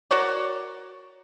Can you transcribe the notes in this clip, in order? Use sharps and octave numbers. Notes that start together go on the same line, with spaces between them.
F#4 A#4 C#5 D5